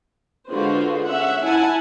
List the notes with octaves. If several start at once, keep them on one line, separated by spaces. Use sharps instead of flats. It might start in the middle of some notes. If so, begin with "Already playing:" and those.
D3 G#3 F4 F#4 B4 C5
C#4 E5 F#5
E4 F#5 G#5 A5